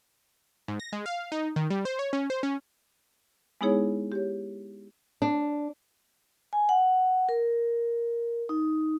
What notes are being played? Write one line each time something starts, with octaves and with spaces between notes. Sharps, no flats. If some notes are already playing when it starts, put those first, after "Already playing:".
G#2
A#6
G#3
F5
D#4
D#3
G3
C5
C#5
C#4
C5
C#4
G#3 B3 D#4 E4 G#4 C#5
G4 C#5
D4
G#5
F#5
A#4
D#4